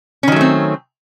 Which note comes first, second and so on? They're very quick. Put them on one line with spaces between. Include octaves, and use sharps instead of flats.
C#4 D#3 F#3 A3 C4